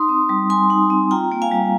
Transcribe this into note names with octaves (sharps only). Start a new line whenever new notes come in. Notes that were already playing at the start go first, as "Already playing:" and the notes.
Already playing: D#4 C6 D#6
C4
G3
G3 G#5 C6
D#4
C4
F4 G5 A#5
A#3
F5 G#5
G3